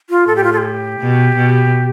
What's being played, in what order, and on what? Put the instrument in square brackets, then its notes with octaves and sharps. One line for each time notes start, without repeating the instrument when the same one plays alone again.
[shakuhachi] F4
[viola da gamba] A2 [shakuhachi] A4
[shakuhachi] G4
F4
A4
G4
[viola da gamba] B2
B2